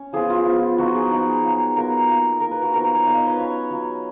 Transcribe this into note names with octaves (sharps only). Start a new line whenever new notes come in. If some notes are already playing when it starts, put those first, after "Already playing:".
Already playing: C#4
F3 B3 F4 G#4
F4
F3 B3 F4
F3 B3 D#4 F#4
G#4
F3 B3 D#4
F#3 B3 F4
F#3 B3 F4 A#4
A#3 F4
A#3 F4 A#4
B4
F#4
F3 B3 D#4 A#4
A#4
C#5
F3 B3 D#4 F5
D#5
B4
F#3 C#4 F4 C#5
F#3 C#4 F4